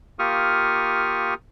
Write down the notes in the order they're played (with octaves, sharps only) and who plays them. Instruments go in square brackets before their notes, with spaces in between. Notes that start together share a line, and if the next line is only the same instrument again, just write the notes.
[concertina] A#3 F4 G4 C#6 D#6 F6